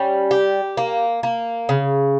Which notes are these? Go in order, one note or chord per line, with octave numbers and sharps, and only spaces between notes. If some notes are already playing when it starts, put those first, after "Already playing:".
Already playing: G3 C#4
G4
A#3
A#3
C#3